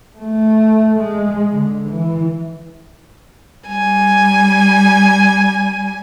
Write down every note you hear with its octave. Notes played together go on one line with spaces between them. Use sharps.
A3
G#3
D3
E3
G3 G#5